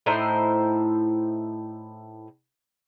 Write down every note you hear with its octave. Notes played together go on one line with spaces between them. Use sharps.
A2 D#4 E4 C5